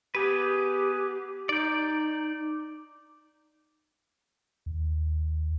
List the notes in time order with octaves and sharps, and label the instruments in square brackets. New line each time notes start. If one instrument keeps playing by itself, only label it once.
[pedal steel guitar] B3 G#4 B4 [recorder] G4
[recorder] D#4 [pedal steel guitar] D5 G6
[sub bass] D#2